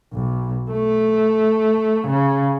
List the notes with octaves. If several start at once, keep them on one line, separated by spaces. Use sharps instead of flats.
B1
A3
C#3